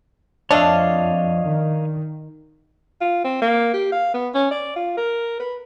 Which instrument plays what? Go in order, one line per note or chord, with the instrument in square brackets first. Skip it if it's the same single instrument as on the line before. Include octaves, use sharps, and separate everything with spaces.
[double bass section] F2 [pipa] A3 D4 [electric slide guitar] C#5 D#5 F5
[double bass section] D#3
[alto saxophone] F4
C4
A#3
G4
F5
B3
C#4
D5
F4
A#4
B4